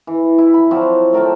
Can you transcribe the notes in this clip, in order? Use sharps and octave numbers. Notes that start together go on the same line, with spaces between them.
E3
E4
B5
F3 F#3 C4 D5
A3 A#4 G5 A5